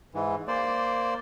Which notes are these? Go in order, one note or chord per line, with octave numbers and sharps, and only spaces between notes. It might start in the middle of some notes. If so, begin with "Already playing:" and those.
G#2 E3
A#3 C5 D5